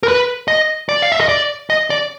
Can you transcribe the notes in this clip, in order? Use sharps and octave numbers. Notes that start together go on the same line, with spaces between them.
A#4
B4
D#5
D5
F5
E5
D#5
D5
D#5
D5